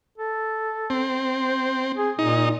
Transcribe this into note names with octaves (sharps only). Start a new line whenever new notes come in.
A4
C4
C5
G#4
A#2 D#4